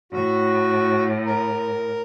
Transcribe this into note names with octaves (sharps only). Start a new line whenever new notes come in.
A2 F#4
A#4